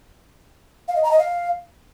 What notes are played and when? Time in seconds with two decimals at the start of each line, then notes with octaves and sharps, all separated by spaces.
0.88 F5
0.96 D#5
1.03 A#5
1.11 D#5
1.19 F5